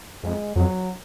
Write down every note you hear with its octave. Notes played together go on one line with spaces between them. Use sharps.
F2 G#3
F2 F#3